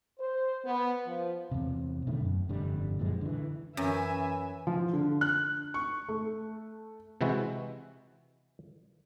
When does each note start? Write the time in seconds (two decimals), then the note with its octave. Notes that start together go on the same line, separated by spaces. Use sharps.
0.19 C5
0.65 B3
1.05 F3
1.51 E2 C3
2.07 B2 D3 D#3 A3
2.20 F#2
2.49 F1 G2 D3 G3
2.99 F#2 A#2 F3 G#3
3.21 D3 E3
3.77 F#2 E3 E5 G#5
4.67 F3
4.93 D3
5.21 F#6
5.74 C#6
6.08 A3
7.21 C3 E3 G#3 E4 F#4